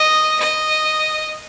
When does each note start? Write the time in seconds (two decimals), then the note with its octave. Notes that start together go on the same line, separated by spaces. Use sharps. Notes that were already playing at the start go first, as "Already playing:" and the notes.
Already playing: D#5
0.40 D#5